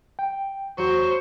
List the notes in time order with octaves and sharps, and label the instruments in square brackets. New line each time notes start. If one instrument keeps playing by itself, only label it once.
[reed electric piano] G5
[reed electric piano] E2 F#4 [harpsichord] F#3 [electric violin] C5 [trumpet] C#6